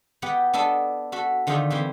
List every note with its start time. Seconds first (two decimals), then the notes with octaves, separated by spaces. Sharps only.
0.22 B3 G4 D#5 F#5 G5
0.53 B3 D4 A4 D#5 A5
1.12 F#4 A4 E5
1.47 D3 D#3 F3 F4 G#4 E5
1.70 E3 G3 C4